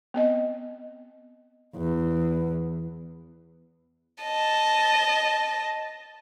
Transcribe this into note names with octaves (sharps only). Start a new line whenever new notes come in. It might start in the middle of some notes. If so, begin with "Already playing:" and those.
B3 C4 D#5
E2
D#5 A5